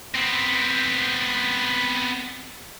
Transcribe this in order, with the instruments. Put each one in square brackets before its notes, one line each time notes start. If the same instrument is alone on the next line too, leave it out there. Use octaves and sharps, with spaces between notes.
[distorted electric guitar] B3 C4